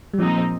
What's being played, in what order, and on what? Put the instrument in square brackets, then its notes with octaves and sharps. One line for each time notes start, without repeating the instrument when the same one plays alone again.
[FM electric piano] G3
[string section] A#2 G#3 C4 D#4 [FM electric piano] F3